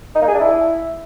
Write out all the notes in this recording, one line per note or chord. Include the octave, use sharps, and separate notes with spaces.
D#4
A#3
G#4
D4
E4